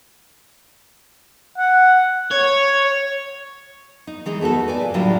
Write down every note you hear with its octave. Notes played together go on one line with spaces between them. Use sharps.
F#5
C#5
D#4
E3 G#3 D#4
A3 B3 F#4 A4
B4 D5 G#5
A#2
A2 D3 F#3 G3 E4 F4